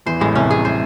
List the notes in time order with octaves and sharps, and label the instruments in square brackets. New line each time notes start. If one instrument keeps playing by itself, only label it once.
[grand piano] E2 E3 [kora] C5
[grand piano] A1 A2 [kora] G#3
[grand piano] C2 C3 [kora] C#4
[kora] G#4
C5